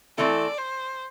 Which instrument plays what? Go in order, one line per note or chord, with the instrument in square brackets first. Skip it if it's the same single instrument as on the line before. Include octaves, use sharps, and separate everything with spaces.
[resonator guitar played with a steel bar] E3 A3 C4 E4 A4 [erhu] D5
[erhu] C5